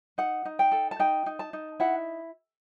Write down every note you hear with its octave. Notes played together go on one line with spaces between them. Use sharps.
D#4 F#5
D#4
G5
A4
A5
D#4 G5
D#4
A5
D#4
E4 F#5